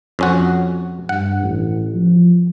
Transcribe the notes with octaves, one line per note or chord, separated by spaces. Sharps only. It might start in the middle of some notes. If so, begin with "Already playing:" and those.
F2 C#4 F#4
G2 F#5
A1
F3